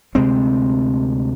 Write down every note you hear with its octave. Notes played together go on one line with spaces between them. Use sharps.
D2 C3 G#3 C4